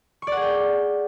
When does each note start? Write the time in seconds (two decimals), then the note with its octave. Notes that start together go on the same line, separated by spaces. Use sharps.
0.22 C#6
0.27 D5
0.32 F#5
0.37 G#4
0.42 G5